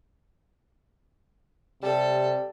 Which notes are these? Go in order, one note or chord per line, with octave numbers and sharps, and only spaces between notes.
C3 G3 A4